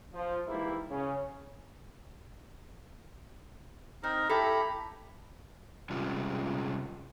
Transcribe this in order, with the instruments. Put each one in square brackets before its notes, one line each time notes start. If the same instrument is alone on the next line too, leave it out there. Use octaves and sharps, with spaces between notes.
[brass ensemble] F3
G#2 E3 G3 A#3 E4
C#3 C#4
[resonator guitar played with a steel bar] C4 [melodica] D#4 [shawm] A#4
[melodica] E4 G4 A#5 [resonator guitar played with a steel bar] A4 [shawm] B5
[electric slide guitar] C3 G3 G#3 C#4 F4